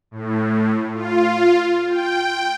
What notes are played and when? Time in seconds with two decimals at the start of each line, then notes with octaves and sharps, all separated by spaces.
0.11 A2
0.94 F4
1.89 G5